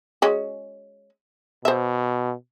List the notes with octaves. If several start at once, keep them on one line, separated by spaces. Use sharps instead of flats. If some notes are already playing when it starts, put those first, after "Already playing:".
G#3 C#4 F#4
B2 C5 E5